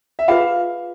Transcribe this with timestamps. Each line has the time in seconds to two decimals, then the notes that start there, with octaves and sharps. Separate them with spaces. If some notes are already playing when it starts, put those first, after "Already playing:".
0.19 E5
0.28 F4 G#4 B4 F5